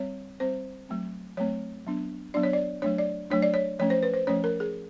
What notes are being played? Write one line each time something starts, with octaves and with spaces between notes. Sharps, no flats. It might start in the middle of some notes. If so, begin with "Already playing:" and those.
Already playing: G3 C4 C#5
G3 C4 C5
F#3 A3 C4
F#3 A3 C4 C#5
F#3 B3 D4
F#3 B3 D4 D5
C#5
D5
F#3 A3 D4 C#5
D5
F#3 A3 D4 C#5
D5
C#5
F3 A3 C#4 C#5
C5
B4
C5
F3 A3 C#4 C#5
A#4
G#4